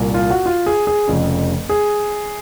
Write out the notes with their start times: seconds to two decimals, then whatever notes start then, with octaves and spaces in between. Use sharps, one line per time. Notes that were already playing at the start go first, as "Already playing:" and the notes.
Already playing: C2 A#2
0.14 F4
0.31 F#4
0.46 F4
0.66 G#4
0.87 G#4
1.07 F1 F2 C#3
1.69 G#4